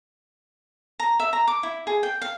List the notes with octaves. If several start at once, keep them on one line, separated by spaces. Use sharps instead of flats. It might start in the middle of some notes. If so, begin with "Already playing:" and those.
A#5
E5
A#5
D6
E4
G#4
G5
F5